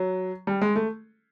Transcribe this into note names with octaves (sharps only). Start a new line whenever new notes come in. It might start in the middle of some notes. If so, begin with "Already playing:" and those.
Already playing: F#3
G3
G#3
A3